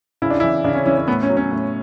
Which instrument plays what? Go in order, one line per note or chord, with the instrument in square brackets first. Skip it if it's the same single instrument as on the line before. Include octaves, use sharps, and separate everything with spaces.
[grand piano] C#3 E4
D4
E4
E3
C#3 D4
C#4
E3 C#4
C#4
A2 B3
C#4
F#3
C#4
A2